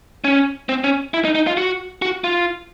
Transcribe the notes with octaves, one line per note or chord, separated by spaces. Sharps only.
C#4
C4
C#4
E4
D#4
D#4
F4
F#4
F#4
F4